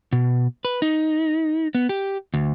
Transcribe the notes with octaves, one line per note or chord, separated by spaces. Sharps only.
B2
B4
D#4
B3
G4
D2